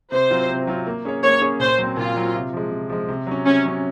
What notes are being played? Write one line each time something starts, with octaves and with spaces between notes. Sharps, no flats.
C3 C5
F#3 C4 F4
C3
F#3 C4 F4
A#3
C#4 G#4 C#5
A#3 C#5
C#4 G#4 C#5
A#2 C5
F#3 C4
A#2 F4
F#3 C4
C3
F3 G#3
C3
F3 G#3
C3
F#3 C#4
C3 C#4
F#3 C#4